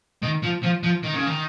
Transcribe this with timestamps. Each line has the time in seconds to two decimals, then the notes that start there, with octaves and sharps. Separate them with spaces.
0.23 D#3
0.43 F3
0.63 F3
0.84 F3
1.03 D#3
1.14 C#3
1.27 D#3